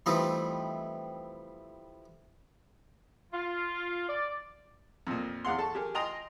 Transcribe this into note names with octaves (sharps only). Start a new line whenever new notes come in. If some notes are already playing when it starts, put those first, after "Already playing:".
E3 F3 G3 A3 C4 D#4
F4
D5
F2 A#2
E2 F5 F#5 C6
A4 A5 C#6
G4 G#4 A#4
D#5 G5 G#5 A#5 C6 D#6